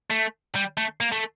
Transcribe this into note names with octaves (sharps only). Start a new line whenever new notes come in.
A3
G3
A3
A#3
A3